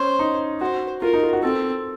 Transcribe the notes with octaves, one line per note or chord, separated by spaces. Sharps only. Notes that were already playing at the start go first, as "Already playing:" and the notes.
Already playing: C#4 C5
D#4
F#4 C5
F4 A#4
D#4
F4
F#4
C4 A4